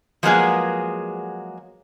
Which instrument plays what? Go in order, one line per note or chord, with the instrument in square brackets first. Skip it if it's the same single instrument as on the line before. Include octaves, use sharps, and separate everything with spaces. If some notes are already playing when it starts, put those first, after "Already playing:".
[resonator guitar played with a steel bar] F3 F#3 G#3 A#3 B3 G#4